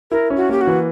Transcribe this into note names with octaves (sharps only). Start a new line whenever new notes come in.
E4 A#4
C#4
F#4
A#3 G4
F#4
E3